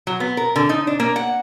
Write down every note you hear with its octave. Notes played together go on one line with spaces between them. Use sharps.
F#3
B3
A#4
D3
D#4
D4
A#3
F#5